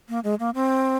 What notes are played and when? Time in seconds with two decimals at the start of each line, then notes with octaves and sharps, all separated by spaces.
0.09 A#3
0.24 G#3
0.40 A#3
0.54 C4